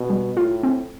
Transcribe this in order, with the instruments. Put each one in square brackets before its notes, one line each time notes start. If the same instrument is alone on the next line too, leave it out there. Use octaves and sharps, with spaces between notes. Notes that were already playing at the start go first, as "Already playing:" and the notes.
Already playing: [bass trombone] B2
[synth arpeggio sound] G3
[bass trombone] A2 [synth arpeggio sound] F4
[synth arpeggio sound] C4